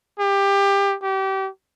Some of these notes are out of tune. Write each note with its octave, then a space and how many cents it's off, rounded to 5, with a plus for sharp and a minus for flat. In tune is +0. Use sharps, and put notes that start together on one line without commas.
G4 +20
G4 -30